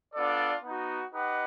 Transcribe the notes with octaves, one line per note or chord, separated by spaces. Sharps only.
B3 D4 F4 A4 D5
B3 D#4 F#4
D#4 G4 B4 D#5 F#5